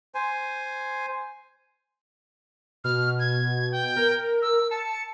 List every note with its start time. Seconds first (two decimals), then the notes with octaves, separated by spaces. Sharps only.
0.15 C5 G#5
2.84 B2 F6
3.19 G#6
3.72 G5
3.97 A#4
4.42 E6
4.71 A5 C#7